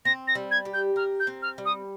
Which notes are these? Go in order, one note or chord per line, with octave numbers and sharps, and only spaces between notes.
C4 A#6
A#6
G3
G#6
G4
G6
A#4 F6
G6
C4
F6
G3
D#6